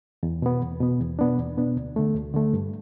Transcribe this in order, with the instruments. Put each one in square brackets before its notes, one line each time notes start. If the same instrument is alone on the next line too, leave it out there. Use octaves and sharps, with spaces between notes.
[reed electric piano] E2
B2 B3
E2
B2 B3
E2
B2 B3 D4
E2
B2 B3 D4
D2
D3 A3
D2
D3 A3
G2